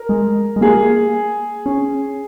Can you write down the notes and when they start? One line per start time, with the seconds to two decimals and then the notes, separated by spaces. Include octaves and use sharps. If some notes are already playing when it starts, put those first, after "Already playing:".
Already playing: A#4
0.09 G#3
0.56 G#3
0.61 A#3 G#4
1.66 C#4